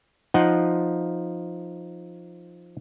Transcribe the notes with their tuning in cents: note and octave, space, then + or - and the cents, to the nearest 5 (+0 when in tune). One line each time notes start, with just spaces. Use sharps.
F3 +0 D#4 +0 F#5 +0